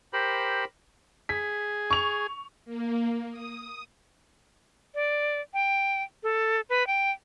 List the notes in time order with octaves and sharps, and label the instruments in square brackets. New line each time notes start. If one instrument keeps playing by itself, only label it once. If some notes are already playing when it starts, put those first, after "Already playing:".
[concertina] G4 A#4 C5 B5
[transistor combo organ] G#4 [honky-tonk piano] B6
[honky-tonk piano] C#6 F7
[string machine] A#3
D#6
[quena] D5
G5
A4
B4
G5